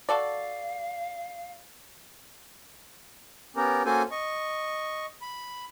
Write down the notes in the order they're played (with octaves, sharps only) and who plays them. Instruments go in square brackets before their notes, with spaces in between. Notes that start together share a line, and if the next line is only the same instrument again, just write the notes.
[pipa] F#4 A4 D5 [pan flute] F5
[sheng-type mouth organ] B3 C#4 G4 A#4
A#3 C#4 F#4 A4 C5 G#5
D#5 C#6
B5